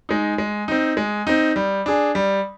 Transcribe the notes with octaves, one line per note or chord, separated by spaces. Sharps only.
G#3 D#4
G#3
C4 D#4
G#3
C4 D#4
G3
D4 G#4
G3